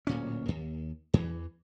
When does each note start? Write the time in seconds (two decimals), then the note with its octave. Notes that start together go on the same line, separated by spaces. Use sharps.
0.07 D1 A#2 C#4
0.48 D#2
1.14 E2 E3